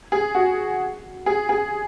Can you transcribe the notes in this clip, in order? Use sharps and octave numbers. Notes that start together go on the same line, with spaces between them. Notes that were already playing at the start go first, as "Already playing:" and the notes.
G#4
F#4
G#4
G#4